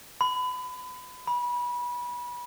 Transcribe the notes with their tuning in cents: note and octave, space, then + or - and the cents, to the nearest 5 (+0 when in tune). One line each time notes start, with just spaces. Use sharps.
B5 +30
B5 -25